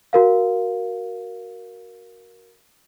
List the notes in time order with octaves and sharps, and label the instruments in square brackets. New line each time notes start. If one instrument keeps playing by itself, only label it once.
[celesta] F#4 A#4 F5